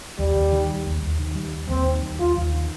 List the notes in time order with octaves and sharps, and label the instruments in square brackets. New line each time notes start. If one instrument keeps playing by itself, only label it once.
[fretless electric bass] D#2 [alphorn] G3
[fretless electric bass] D#2
D#3
G3
D#2
D#2
D#3
G3
D#2
[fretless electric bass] D#2 [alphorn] C4
[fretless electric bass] D#3
G3
[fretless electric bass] D#2 [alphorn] F4
[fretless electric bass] D#2
D#3